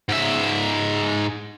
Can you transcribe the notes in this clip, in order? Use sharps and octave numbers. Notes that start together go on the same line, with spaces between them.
G#2 E5